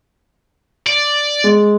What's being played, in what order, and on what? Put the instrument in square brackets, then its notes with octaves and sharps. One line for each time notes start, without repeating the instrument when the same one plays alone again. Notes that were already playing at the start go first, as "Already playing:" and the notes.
[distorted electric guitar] D5
[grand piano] G#3